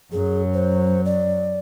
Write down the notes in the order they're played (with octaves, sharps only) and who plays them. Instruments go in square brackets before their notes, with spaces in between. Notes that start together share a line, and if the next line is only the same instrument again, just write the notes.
[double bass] F#2 F#3 [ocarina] G#4
[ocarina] C5
D5